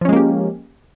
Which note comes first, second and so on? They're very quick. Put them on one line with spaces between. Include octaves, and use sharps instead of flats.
F3 C#4 G#3 A#3 G4